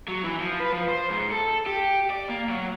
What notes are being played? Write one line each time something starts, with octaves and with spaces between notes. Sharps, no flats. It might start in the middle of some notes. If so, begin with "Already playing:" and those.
F#3
E3
F3
B4
F3
C5
G#2
A4
G4
D5
A#3
F#3